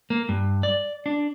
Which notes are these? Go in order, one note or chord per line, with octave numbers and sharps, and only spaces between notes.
A#3
G2
D5
D4